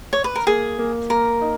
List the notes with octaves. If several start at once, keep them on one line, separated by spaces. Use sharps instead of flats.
C#5
B4
A#4
A#3 G#4
A#3
A#3 A#4
D#4